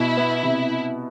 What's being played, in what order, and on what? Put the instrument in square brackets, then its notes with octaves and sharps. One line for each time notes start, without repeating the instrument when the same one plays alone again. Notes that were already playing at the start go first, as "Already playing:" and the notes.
Already playing: [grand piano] B2 [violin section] E4
[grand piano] B3
C3